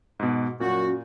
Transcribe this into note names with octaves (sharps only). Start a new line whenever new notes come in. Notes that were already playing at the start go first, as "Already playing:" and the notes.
G#2 B2
F#2 A#2 F#4